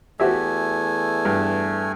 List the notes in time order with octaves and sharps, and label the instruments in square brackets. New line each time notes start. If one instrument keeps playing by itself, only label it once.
[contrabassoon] E2 [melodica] A3 G#5 [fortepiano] F#4 G4 E5
[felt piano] G2